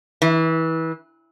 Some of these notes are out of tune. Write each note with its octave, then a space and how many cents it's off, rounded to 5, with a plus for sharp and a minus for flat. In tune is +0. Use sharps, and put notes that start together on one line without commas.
E3 -25